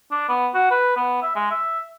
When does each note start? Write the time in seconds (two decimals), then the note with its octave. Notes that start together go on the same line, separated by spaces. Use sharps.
0.11 D4
0.29 B3
0.54 F#4
0.71 B4
0.97 B3
1.22 E5
1.36 G#3
1.51 E5